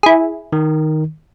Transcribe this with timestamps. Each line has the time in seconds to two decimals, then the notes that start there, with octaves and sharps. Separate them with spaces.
0.03 E4 G#4
0.53 D#3